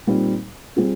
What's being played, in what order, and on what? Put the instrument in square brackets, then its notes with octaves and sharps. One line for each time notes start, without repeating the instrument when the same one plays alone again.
[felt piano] A#2 G3 C4 D#4
G3 C4 F4 G#4